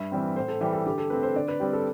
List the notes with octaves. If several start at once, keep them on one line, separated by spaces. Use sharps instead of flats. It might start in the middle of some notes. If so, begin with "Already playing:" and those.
Already playing: G2 E5
E3 G3 C4
A2 C5
A4
E3 G3 G4
A4
D3 G4
A4
A3 C4 B4
C5
D3 D5
B4
G3 C4 G4
A4